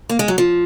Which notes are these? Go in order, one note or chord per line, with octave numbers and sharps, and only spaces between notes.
A#3
G#3
F#3
F3